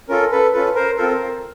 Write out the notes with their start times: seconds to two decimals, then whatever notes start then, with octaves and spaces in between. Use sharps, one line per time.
0.09 C#4 F4 A4 A#4
0.31 A4 B4
0.53 C#4 F4 A4 B4
0.75 A#4 C5
0.97 C4 F4 A4 A#4 C5